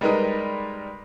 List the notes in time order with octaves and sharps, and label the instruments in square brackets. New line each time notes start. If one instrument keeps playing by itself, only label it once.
[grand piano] G3 G#3 D#4 A#4 B4 D#5